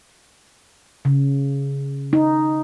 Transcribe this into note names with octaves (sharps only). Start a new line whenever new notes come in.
C#3
D#4